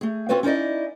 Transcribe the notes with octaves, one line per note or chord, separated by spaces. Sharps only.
A3 G#4
C4 F4 F#4 B4 C#5
C#4 D#4 E4 D5 D#5